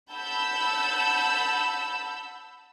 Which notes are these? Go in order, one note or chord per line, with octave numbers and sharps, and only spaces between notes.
F#5 A5 B5 E6 G6